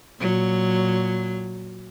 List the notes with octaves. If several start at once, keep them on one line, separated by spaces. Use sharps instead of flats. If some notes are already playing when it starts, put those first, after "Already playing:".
A#2 F#3